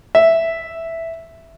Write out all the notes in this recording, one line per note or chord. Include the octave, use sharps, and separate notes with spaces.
E5